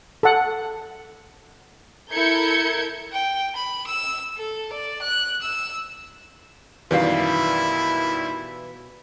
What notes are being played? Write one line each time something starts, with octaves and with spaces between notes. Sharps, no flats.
A4 F#5
E4 A4 A#4 G6 G#6 C#7
G5
B5
E6
A4
D5
F#6
E6
F#2 B2 D#3 E3 G3 E4 D5 F5